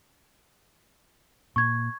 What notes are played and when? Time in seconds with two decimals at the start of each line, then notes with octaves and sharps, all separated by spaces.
1.56 A#2 C#6 G#6